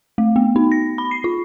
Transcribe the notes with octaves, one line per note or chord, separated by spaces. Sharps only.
A3
B3
D#4
A#6
B5
C7
F4